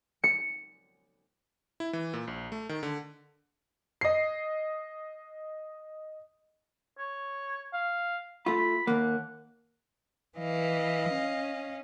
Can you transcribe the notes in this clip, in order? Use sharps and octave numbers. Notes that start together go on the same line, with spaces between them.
C#7
E4
E3
A#2
A#1
A3
D#3
D3
D#5 C7
C#5
F5
A3 F4 B5
D#2 A#3 F#5
E3 D#5 F5
C#4